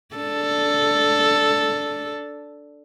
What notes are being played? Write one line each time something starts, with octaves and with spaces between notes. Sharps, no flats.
D4 A4